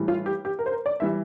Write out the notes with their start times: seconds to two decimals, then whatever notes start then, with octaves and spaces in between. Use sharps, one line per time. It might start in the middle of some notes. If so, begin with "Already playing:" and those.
Already playing: A2 E3 G3
0.08 F4
0.26 G4
0.45 G4
0.59 A#4
0.66 C5
0.72 A#4
0.86 D5
1.00 E3 G3 E5